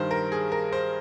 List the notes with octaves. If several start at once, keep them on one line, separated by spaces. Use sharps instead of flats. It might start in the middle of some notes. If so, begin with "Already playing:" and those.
Already playing: G2 D#3 G3 C5
A#4
G#4
A#4
C5